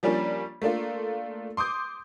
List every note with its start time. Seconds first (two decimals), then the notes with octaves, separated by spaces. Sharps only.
0.03 F3 G3 A#3 C#4 D4
0.62 A3 A#3 D4 F4
1.57 C6 D6 D#6 G6